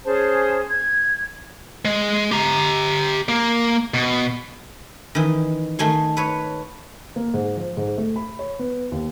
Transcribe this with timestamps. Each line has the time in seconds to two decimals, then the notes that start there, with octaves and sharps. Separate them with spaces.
0.04 C#4 G#4 C5 A5
0.67 G#6
1.85 G#3
2.32 G4 A#5
3.29 A#3
3.94 B2
5.15 D#3 E3
5.79 D#3 A3 G#5 C6
6.17 B4 C#5
7.16 A#3
7.34 G#2
7.57 F3
7.77 G#2
7.98 A3
8.16 B5
8.39 C#5
8.59 B3
8.92 D#2